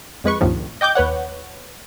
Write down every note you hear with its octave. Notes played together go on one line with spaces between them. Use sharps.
F2 G#3 B4 C#6
C#2 G2 A#2 D#3 F3
D#5 G5 D6 G6
D#2 B4 C#5 F#5